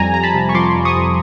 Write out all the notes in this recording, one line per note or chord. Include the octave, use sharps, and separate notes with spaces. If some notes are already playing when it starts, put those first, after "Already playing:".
Already playing: F2 G3 G#5 A#5
F2 A#5
A5 B5
C3
C#6
F3 C6 D6
F2
C#6 D#6
F2